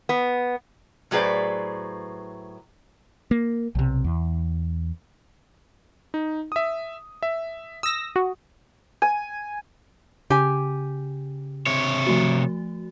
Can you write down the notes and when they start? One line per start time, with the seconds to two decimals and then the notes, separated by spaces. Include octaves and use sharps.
0.09 B3
1.11 A2 F#3 G#4 B4 C5 D5
3.31 A#3
3.75 B1 C3
4.04 E2
6.14 D#4
6.52 E5 D#6
7.23 E5
7.83 D#6 E6 A#6
8.16 F#4
9.02 G#5
10.30 C#3 G4 G#5
11.67 C3 C#5
12.07 F3 A3 F#4